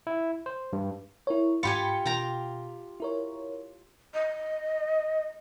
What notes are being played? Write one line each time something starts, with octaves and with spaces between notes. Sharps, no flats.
E4
C5
G2
E4 A#4 C#5
G#2 F4 G4 G#5 B5 C#7
B2 F4 G5 A#5
E4 A#4 C#5
D#5